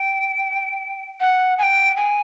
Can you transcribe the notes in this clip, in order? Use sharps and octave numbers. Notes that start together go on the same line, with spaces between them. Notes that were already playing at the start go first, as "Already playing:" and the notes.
Already playing: G5
F#5
G#5
G5
G#5